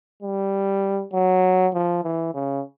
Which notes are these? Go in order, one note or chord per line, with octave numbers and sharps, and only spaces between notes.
G3
F#3
F3
E3
C#3